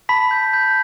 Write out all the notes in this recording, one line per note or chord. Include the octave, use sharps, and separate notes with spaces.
A5 B5 B6
G6
G6